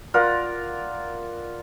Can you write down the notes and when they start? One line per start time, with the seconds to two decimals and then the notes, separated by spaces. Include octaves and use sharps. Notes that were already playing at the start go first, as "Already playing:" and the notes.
0.14 F4 A#4 D5 F#5